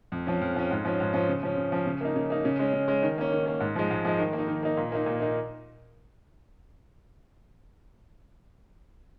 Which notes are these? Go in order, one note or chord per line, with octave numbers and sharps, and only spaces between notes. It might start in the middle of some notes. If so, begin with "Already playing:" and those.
F2
F3 C#4
F2
F3 C#4
G#2
F3 C#4
G#2
F3 C#4
C#3
F3 C#4
C#3
F3 C#4
C#3
A#3 D#4
C#3
A#3 D#4
C#3
G#3 C#4
C#3
G#3 C#4
D#3
A#3 C#4
D#3
A#3 C#4
G#2
F3 G#3
G#2
F3 G#3
D#3
A#3
D#4
D#3
A#3 D#4
A#2
A#3 D#4
A#2
A#3 D#4